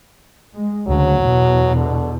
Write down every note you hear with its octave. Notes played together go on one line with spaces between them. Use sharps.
G#3
D2 C#3 F#3
E2 B2
D3